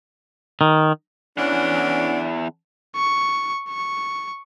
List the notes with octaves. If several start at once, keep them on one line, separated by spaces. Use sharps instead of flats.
D#3
E2 E3 C#4 D4 F#5
C#6
C#6